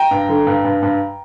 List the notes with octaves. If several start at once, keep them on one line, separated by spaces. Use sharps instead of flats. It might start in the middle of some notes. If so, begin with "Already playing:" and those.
Already playing: G5 A#5
G2
D3
G2
G2
G2